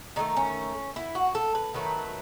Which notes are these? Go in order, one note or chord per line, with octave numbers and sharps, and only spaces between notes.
D#3 F#3 A3 D#4
C#4
E4
F#4
A4
B4
D#3 F#3 A3 B4